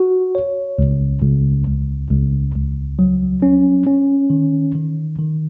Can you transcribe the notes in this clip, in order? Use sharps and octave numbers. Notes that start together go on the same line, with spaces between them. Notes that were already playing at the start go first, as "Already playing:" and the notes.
Already playing: F#4
C#5
C#2
C#2
C#2
C#2
C#2
F#3
C#4
C#4
D#3
D#3
D#3